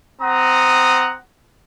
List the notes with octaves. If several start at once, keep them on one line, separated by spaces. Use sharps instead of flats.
C4 F#5 A#5 D#6